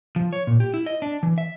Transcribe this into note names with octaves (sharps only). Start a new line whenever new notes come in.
F3
C#5
A#2
G4
E4
D#5
D4
E3
E5